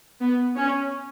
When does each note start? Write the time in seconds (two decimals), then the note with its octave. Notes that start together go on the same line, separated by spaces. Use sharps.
0.20 B3
0.56 C#4